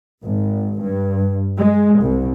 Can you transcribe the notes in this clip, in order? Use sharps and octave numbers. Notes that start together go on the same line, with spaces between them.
G#1
G2
G#3
C2